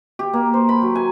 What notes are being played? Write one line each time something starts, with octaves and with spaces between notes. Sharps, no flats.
G4
A#3
C5
B5
F#3
G#5